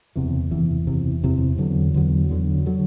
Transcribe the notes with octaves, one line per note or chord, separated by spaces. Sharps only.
F#1 E2 C3 E3
F#1 E2 C3 E3
F#1 E2 C3 E3
F#1 E2 C3 E3
E2 D3 F#3
E2 D3 F#3
E2 D3 F#3
D3 F#3